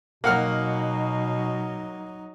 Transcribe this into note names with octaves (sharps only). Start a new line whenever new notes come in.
B2 F#3 A#3 D#4 F#5 F6